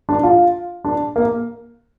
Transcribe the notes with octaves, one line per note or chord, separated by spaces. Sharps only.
D4
F4
D4
A#3